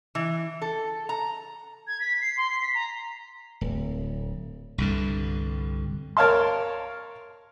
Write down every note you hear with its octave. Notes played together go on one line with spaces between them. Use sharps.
E3
A4
A#5
G#6
B6
C7
C6
C7
B6
A#5
D1
C2 G2 D3
A#4 C#5 D5 F5 A5 C6